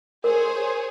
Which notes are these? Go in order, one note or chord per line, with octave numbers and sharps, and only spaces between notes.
G#4 A#4 C5 C#5